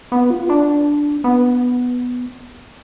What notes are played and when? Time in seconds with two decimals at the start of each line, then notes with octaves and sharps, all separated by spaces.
0.12 B3
0.30 F4
0.49 D4
1.24 B3